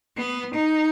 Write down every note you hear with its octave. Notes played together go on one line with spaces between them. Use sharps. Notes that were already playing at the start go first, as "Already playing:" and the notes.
B3
D#4